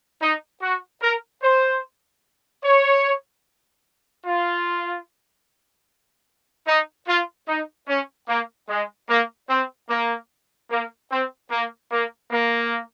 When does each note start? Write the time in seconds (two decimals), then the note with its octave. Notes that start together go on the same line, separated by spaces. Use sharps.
0.21 D#4
0.62 F#4
1.02 A#4
1.43 C5
2.64 C#5
4.25 F4
6.67 D#4
7.07 F4
7.48 D#4
7.88 C#4
8.28 A#3
8.69 G#3
9.09 A#3
9.49 C4
9.90 A#3
10.71 A#3
11.11 C4
11.51 A#3
11.91 A#3
12.32 A#3